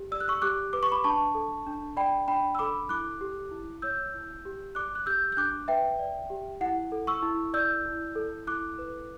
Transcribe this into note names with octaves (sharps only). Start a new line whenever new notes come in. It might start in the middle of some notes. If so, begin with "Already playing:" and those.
Already playing: G4
D5 E6
F#6
C#6 E6
G4 D6 F#6
B4 D6
C#6
B5 D6
D4 A5 C#6
A4
D4
D5 G5 B5
D4 G5 B5
E6
A4 B5 D6
E4 D6 F#6
G4
E4
C#5 E6 G6
E4
G4
D5 D6 F#6
F#6
G4 E6 G6
G6
D4 D6 F#6
B4 E5 G5
D5
G4
E4 F#5
A4
C#6 E6
E4
D5 E6 G6
E4
A4
E4 D6 F#6
B4